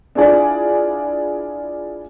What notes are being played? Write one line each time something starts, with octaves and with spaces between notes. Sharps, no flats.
D4 E4 F4 G#4 D5